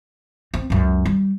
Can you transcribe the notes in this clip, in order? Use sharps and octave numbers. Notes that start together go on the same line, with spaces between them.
C4
C#2 F#2
G3